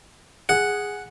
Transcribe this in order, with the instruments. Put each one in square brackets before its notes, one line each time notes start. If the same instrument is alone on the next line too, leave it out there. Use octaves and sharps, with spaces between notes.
[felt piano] G#4 [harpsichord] F#5